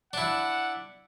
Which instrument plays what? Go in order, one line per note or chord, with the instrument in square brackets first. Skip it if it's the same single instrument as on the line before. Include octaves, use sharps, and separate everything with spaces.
[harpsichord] D4 E4 [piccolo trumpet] F#5